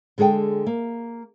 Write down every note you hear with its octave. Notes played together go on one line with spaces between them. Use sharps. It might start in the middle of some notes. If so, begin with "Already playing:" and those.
D3 G#3 G#4 A4 G5
A#3